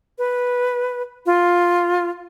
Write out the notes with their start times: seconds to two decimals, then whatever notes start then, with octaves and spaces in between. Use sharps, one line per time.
0.18 B4
1.26 F4